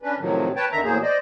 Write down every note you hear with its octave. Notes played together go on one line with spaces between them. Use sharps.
C#4 D4 B4
A2 C3 D#3 F3 F#3
B4 C#5 G5 A5
E2 D3 D#3 E5 A#5
E2 A2 F#3 A#3 G#4 C5
C5 D5 D#5